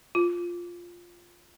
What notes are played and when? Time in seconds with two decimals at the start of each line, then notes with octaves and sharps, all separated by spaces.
0.15 F4